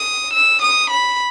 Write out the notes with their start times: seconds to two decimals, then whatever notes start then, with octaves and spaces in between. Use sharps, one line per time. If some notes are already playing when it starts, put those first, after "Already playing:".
Already playing: D#6
0.33 E6
0.62 D#6
0.90 B5